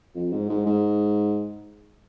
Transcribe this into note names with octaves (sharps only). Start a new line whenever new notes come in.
F2
G#2
G#2
G#2